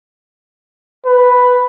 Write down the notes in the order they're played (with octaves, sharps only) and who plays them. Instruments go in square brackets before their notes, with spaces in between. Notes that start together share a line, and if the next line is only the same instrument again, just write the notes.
[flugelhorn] B4